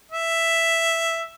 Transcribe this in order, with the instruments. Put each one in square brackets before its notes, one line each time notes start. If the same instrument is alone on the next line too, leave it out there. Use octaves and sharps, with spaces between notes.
[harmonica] E5